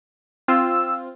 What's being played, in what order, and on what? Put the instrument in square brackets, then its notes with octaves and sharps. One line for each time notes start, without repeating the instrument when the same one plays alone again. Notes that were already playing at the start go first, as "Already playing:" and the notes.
[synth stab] C4 F4 [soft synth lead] E6